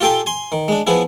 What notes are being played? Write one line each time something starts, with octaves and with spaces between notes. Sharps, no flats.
F4 G4 A4 G5 G#5 C6
G#5 C6
D#3
G#3 D4
F3 B3 E4 G#4